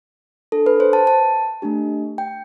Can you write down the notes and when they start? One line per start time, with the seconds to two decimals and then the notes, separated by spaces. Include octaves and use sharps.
0.52 D4 A4
0.66 B4
0.80 C5
0.93 A5
1.07 A5
1.62 A3 D4 G4
2.18 G5